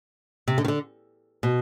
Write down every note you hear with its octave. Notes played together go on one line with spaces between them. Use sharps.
C3
D3
D#3
D3
B2